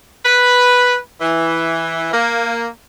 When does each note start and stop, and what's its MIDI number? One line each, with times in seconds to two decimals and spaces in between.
0.24 0.95 71
1.21 2.09 52
2.13 2.67 58